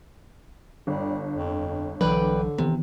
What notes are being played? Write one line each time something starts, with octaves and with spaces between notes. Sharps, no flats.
G1 G3
F2
B1 D3 E3 F#3 B4 D5 G5
C3 D#3 E3 B3